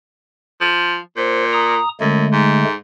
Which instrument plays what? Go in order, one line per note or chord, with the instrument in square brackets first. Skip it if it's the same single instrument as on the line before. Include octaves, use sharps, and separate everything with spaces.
[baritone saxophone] F3
[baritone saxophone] A#2 [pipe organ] C5
[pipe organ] A#5 D#6
[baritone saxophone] F#2 [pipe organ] D3 G#3 A3
[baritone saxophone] G#2